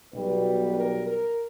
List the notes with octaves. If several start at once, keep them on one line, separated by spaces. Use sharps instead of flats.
B1 B2 G3 B4
A#4
A#4